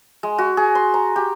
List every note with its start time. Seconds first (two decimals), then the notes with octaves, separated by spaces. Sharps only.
0.23 G#3
0.38 F#4
0.57 G#4
0.75 C6
0.94 A#5
1.16 G4